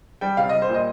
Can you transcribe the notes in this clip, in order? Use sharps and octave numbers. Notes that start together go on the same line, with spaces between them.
G3 G5
C3 F5
G3 D#5
C5
A#2
D#5